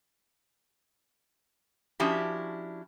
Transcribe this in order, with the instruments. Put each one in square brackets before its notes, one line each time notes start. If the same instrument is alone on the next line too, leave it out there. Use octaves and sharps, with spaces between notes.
[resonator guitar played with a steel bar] F3 C#4 D4 E4 F#4 G4